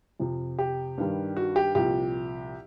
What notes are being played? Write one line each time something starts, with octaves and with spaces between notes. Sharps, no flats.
F2 C3 F3
G4
G2 D#3 G3
F#4
G4
C2 A#2 F3 G4